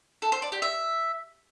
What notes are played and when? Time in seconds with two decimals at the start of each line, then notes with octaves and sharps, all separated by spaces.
0.22 A4
0.32 C5
0.42 D5
0.52 G4
0.62 E5